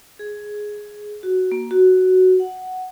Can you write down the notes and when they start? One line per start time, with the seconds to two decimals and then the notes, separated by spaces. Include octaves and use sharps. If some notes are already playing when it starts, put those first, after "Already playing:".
0.19 G#4
1.23 F#4
1.52 A#3
1.71 F#4
2.40 F#5